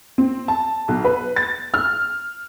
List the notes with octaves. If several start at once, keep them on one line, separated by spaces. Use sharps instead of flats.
C4
A5
B1
B4
A6
F6